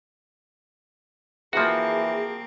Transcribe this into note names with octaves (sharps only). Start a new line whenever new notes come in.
E3 F3 A#3 C4 F#4 G#4